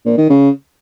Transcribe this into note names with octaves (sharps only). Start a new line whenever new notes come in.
A#2
D#3
C#3